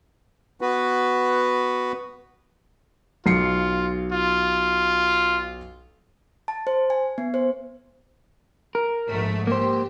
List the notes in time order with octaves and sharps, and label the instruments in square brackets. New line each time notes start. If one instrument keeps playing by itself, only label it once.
[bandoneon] B3 F#4 B4
[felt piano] B1 C7 C#7 [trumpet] F4
[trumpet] F4
[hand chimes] A5
C5
G#5
B3
C5
[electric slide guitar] A#4
[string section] A#1 G#2 A3
[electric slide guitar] A#3 C5 [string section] G4